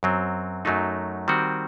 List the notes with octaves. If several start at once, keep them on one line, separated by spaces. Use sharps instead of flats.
F#2 F#3 C4
F#2 F#3 A3 D#4
D#3 G3 C4 F#4